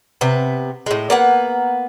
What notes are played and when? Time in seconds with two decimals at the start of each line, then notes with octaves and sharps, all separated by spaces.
0.21 C3 B3
0.86 A2 G#3
1.10 A#3 B3 F#5